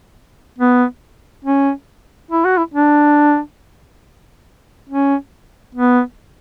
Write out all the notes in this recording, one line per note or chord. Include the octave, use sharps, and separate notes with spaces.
B3
C#4
E4
F#4
E4
D4
C#4
B3